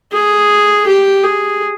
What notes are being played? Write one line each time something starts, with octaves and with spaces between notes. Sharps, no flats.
G#4
G4
G#4